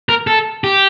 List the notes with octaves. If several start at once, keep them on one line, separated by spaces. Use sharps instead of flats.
A#4
A4
G4